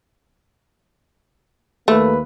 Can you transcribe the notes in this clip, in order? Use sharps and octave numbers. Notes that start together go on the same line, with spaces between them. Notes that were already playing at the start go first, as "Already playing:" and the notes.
D#2 A3 A#3 B4